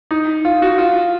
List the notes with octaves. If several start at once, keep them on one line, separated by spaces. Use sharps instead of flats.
D#4
F4
F#4
F4